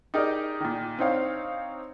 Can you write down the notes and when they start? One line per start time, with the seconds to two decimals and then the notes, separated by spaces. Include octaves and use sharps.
0.14 D#4 G4 G#4 A#4 D5 D#5
0.60 A#2 D#3
0.99 C4 D4 D#4 C5 C#5 F5